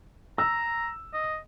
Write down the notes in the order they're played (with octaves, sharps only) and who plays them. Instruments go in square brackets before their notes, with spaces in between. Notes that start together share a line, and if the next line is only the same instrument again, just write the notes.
[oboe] A#5 [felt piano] E6
[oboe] D#5